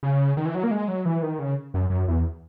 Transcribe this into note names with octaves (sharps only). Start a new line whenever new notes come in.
C#3
D#3
E3
F#3
A#3
G#3
F#3
E3
D#3
C#3
F#2
F#2
E2